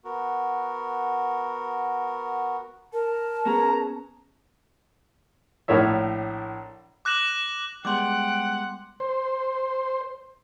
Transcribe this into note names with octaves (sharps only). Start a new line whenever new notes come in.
B3 F#4 A#4
A#4 A5
B3 C#4 G#4 A#5
A#1 A2 A#4 C#5 E5
D6 F#6 A#6 E7 F#7
G3 G#3 B3 F#5 G5 C6 D6
C5